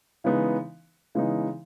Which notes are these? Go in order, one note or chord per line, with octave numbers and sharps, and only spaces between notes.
C#3 E3 G#3 B3 D#4
C#3 E3 G#3 B3 D#4